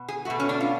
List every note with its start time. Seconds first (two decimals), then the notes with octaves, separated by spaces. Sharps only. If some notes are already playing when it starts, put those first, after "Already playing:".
Already playing: B2
0.08 G#4
0.25 B2 A3 F#4
0.40 C#4
0.49 D4
0.60 F4